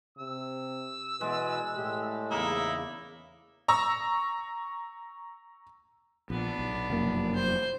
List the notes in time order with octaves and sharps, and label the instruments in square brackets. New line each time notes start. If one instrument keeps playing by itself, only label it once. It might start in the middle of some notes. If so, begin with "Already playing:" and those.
[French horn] C3 [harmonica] E6
[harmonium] B2 B4 [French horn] E3 [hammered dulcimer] G#3 D5
[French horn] A2 [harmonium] G4
[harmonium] E2 C#3 [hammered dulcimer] A#3 [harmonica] D#4 E4 E5
[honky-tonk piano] A#5 C#6 E6
[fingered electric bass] A#1 [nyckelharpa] B3 D4
[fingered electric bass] B1
F1 F#2 A#3
[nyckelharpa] C5